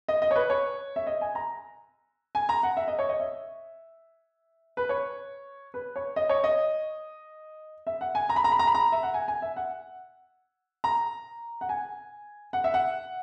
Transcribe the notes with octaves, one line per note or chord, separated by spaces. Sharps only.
D#5
D#5
C#5
B4
C#5
E5
D#5
G#5
A#5
G#5
A#5
F#5
E5
D#5
C#5
D#5
E5
B4
C#5
B4
C#5
D#5
C#5
D#5
E5
F#5
G#5
A#5
B5
A#5
B5
A#5
B5
A#5
E5
F#5
G#5
G#5
E5
F#5
A#5
F#5
G#5
F#5
E5
F#5